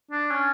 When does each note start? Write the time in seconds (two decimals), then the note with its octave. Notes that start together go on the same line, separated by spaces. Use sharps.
0.11 D4
0.31 C#4